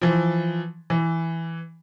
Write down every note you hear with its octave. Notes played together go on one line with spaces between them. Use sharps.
E3 F3
E3